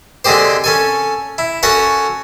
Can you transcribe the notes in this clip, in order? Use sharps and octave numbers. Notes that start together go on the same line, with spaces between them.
D3 G#3 C4 G4 C5
C#4 A4 G#5
E4
C#4 F#4 A4 C#5 F#5